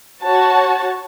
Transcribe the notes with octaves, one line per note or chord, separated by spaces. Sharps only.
F#4 C#5 A5